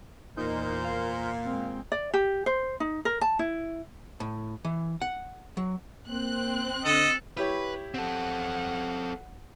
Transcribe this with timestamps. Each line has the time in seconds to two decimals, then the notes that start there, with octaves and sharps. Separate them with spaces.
0.37 E2 A#2 D#4 A#4 C5 G6
0.84 F5
1.45 G#3 C4
1.92 D5
2.14 G4
2.46 C5
2.80 D#4
3.05 A#4
3.21 A5
3.39 E4
4.20 A2
4.65 E3
5.01 F#5
5.57 F#3
6.08 A#3 C4 F#6
6.85 D3 A4 D#5
7.37 E4 G4 B4 C#5
7.94 C4 A4 F#5